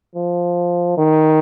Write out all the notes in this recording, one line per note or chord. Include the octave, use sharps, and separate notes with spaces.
F3
D#3